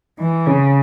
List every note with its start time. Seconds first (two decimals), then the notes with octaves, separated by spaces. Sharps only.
0.19 E3
0.46 C#3